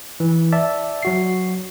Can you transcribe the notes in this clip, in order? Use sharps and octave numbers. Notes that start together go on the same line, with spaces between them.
E3
D5 E5 A5
F#3 F#4 C7